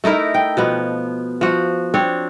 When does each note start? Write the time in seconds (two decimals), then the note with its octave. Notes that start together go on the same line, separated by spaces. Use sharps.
0.04 A3 D#4 E4 A#4
0.34 G5
0.57 B2 F3 B3
1.41 F3 F#4
1.94 C4 D4 C#5